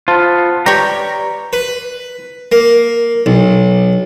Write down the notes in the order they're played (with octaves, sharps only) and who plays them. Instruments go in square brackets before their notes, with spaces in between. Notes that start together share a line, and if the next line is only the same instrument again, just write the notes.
[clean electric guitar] B3 F4 [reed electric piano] C5 A5 F6
[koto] G4 C#5 [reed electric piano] B4 D5 [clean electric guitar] A#5
[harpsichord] B4
A#3
B1